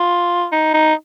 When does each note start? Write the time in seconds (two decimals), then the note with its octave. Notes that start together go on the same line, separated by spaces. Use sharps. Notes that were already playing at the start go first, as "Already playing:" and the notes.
Already playing: F4
0.52 D#4
0.74 D#4